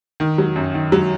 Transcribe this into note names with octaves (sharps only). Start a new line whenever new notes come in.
D#3
F#3
F#2
D#3
F#3